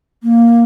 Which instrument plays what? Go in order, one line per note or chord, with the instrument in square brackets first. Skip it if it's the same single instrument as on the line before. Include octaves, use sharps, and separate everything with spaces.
[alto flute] A#3